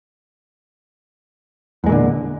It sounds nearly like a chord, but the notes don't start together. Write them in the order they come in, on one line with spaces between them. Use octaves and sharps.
E2 G#3 A#2 D3